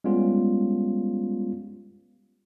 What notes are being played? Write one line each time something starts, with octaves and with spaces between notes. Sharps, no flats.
G3 G#3 B3 C#4 F4